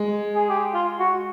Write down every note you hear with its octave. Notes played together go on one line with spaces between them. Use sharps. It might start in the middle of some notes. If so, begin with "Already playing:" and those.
Already playing: G#3
G#4
G4
F4
F#4